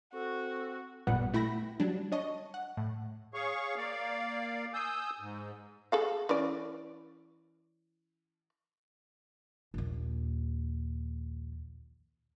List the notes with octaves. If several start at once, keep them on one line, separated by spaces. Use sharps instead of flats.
C4 F#4 A4
A1 F#2 A#2 G3 B3 F#5
A3 E4 G5 B5 A#6
F#3 G3 D4
D4 C#5 D#5 A5 C#6
F#5
A2
G#4 C#5 F5 C#6
A#3 D5 F5
G#5 D#6 E6 G6
G#2
G#4 A4 F5
E3 C#4 D5
A#1 D#2